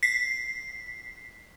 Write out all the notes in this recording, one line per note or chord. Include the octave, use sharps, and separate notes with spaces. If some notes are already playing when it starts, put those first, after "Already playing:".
B6 C7